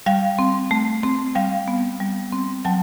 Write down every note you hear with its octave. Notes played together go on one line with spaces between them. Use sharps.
G3 F5 G5
C4
A3
C4
G3 F5 G5
B3
G3
C4
F#3 G5 A5